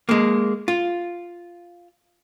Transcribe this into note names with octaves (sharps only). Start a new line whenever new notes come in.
G#3 A#3
F4